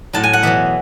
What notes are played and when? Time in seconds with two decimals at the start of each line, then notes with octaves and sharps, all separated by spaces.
0.13 A2 F#3 A5
0.23 G#5
0.33 F#5
0.43 E2 B2 F#3 E5